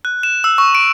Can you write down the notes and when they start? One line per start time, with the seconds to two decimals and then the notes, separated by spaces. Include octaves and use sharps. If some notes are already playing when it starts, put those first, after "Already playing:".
0.05 F#6
0.23 E7
0.44 E6
0.58 C#6
0.75 D7